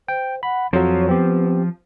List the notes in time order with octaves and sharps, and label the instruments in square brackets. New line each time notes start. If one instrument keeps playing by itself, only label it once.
[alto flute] C5 [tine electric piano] G5
[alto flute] F#5 [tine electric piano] B5
[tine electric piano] F2 F#3 [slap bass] F3 [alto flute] C#5
[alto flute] B3 [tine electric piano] C4 G4